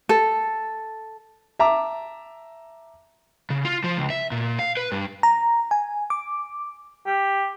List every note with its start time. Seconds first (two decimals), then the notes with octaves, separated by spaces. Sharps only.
0.09 A4
1.59 E5 A5 A#5 D6
3.50 C#3
3.65 F4
3.84 F3
3.98 C#2
4.10 E5
4.31 A#2
4.59 F5
4.77 B4
4.92 G2
5.23 A#5
5.71 G#5
6.10 D6
7.06 G4